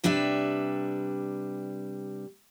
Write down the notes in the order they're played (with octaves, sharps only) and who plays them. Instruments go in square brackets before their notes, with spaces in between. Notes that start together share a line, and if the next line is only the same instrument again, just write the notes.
[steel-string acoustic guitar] C3 G3 D4 B4 E5